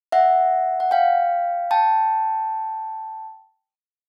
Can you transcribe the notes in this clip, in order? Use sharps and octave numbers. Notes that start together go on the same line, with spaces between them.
E5 F#5
F#5
F5 G5
G5 A5